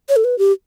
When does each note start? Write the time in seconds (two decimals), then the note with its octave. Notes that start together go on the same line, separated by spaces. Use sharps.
0.09 C#5
0.16 A4
0.24 B4
0.39 G4